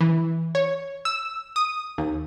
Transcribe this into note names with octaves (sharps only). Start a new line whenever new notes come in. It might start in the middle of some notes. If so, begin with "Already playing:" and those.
E3
C#5
E6
D#6
D#2